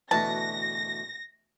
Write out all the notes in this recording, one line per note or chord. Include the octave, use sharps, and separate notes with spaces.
D2 B2 E3 A5 A#6